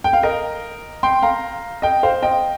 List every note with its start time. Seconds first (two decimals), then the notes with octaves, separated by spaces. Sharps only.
0.04 G5
0.13 F5
0.23 A#4 D#5
1.03 G5 C6
1.22 F5 A#5
1.82 D#5 G5
2.03 C5 F5
2.22 D#5 G5